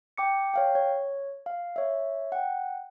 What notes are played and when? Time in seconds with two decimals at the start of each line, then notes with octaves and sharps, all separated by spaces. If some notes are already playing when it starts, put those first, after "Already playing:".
0.18 G5 D6 C#7
0.54 C#5 F5 G5
0.75 C#5
1.46 F5
1.76 C#5 E5
2.32 F#5 G5